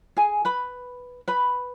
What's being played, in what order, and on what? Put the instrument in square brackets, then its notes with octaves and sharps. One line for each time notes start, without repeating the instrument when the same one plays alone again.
[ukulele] G#4 G#5
B4 B5
B4 B5